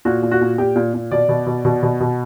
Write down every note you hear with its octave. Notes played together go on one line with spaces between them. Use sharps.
A#2 F#4
A#2
F#4
A#2
A#2 G4
A#2
A#2
B2 D5
B2
B2
B2
B2
B2